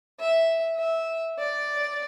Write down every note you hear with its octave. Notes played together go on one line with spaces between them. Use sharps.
E5
E5
D5